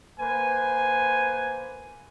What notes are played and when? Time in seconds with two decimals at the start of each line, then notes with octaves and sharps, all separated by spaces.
0.20 A#3 B4 C5 G#5